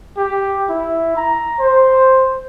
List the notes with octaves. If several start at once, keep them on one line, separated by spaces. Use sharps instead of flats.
G4
E4
A#5
C5